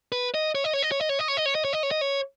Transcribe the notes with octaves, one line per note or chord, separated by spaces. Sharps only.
B4
D#5
C#5
D#5
C#5
D#5
C#5
D#5
C#5
D#5
C#5
D#5
C#5
D#5
C#5
D#5
C#5
D#5
C#5